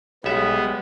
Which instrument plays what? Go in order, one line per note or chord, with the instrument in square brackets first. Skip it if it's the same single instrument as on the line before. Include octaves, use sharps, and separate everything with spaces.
[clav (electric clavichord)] B1 E5 [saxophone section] G3 G#3 [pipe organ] B3